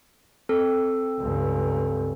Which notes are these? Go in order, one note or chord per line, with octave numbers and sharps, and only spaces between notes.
C4 A4
C#2 G2